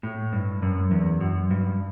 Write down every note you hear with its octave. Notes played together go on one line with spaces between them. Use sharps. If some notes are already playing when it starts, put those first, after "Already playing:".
A2
G2
F#2
E2
F#2
G2